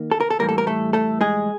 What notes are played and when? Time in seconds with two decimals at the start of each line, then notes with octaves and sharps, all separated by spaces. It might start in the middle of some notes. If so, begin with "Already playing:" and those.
Already playing: D#3 A#3
0.11 A4
0.21 A#4
0.30 A4
0.39 A2 E3 G3 A#3 A#4
0.49 A4
0.58 A#4
0.67 A3 A4
0.93 A3 A4
1.21 G#3 G#4